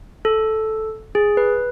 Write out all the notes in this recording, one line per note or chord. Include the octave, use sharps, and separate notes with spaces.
A4
G#4
B4